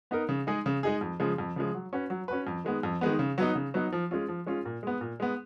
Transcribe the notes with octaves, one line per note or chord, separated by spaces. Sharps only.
B3 D#4 A#4
C#3
G#3 D#4 G#4
C#3
G#3 D#4 G#4
F2
C#3 F3 G#3
F2
C#3 F3 G#3
F#3
C#4 F#4 B4
F#3
C#4 F#4 B4
F2
D#3 G#3 B3
F2
D#3 G#3 B3
C#3
F#3 B3 D#4
C#3
F#3 B3 D#4
F3
G#3 C#4 F4
F3
G#3 C#4 F4
A#2
G#3 B3
A#2
G#3 B3